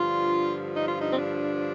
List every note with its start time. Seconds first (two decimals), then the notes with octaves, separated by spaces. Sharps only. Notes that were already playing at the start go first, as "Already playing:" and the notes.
Already playing: G2 D3 F3 F4
0.76 D#4
0.88 F4
1.00 D#4
1.12 C4
1.17 D4